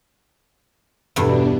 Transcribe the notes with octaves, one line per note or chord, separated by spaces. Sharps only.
E2 G2 B2 D4